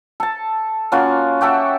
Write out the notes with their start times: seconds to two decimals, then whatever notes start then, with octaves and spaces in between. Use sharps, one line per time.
0.20 A4 A5
0.92 A#3 C#4 F4 F#4
1.41 F#4 G4 A4 E5